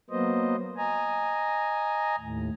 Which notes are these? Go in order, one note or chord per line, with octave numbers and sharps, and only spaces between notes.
F#3 A#3 B3 C5 D#5
D#5 G#5 A#5
D#2 A2